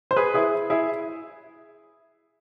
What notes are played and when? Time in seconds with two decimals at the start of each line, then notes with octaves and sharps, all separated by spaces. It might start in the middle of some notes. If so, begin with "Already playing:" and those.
0.11 C5
0.16 G#4 B4
0.34 E4 G#4
0.70 E4 G#4